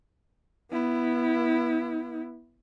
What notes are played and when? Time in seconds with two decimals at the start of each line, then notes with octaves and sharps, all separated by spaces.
0.72 B3 E4